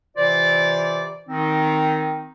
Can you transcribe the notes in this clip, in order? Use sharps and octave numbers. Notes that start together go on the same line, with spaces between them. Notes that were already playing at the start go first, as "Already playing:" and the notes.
C3 E3 F4 C5 D5
D#3 C4 D#4